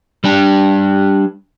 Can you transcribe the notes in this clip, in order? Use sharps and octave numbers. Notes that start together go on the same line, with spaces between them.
G3 D4 G4